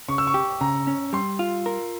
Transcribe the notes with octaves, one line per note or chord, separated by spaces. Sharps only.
C#3 C#6
E6
C#6
G4
C#3 A#5
C#4
G3 C6
F4
A#4